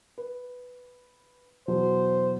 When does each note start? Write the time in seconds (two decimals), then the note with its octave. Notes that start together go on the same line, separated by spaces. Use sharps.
0.18 B4
1.68 E2 B2 F#3 C5